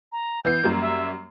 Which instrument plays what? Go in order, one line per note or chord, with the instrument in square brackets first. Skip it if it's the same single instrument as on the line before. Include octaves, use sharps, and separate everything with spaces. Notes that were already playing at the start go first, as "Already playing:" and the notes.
[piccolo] A#5
[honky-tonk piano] E3 B3 C7 [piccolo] G6
[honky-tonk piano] F#2 G3 A#3
[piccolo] E5